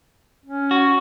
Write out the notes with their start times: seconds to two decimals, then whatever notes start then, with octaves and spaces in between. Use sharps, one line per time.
0.45 C#4
0.71 F#4